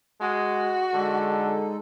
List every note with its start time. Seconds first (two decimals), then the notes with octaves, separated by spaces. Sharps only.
0.21 G#3 F#4
0.94 D3 G#3 D#4 A4